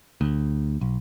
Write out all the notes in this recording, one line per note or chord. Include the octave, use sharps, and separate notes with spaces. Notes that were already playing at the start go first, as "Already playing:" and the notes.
D2
B1